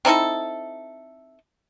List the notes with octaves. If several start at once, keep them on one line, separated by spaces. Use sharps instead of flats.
C4 D#4 E4 A4